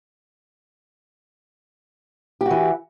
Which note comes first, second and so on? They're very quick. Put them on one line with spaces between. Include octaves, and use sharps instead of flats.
G4 F#4 E3